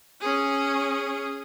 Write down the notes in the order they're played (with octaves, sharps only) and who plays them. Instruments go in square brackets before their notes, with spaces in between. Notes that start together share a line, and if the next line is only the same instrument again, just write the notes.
[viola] C#4 G#4